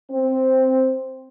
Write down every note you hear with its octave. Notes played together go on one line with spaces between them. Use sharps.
C4